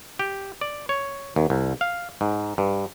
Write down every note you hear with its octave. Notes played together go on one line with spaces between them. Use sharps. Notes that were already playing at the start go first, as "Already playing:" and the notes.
G4
D5
C#5
D#2
C2
F5
G#2
G2